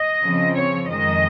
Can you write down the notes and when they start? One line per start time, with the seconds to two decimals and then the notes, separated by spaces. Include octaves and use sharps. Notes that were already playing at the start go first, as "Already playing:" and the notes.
Already playing: D#5
0.24 C#3 F3 C4
0.56 C#5
0.88 F2 D#3 G#3 D#5